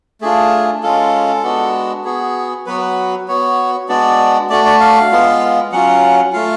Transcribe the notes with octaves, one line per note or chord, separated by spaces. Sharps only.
A3 D4 F4 G#4
G#3 C#4 F4 A4
G#3 B3 D4 F#4
B3 F#4 G#4
F#3 B3 F#4 B4
B4
B3 F#4 C#5
G#3 B3 D4 F#4 D5
A3 D4 F#4 D5
D5
F5
G#3 B3 F4
F#3 C#4 F4 F#5
A3 F4 F5